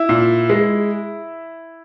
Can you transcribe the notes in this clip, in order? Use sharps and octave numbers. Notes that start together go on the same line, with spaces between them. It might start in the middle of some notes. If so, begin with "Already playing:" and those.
Already playing: E4 E5
A#2
G#3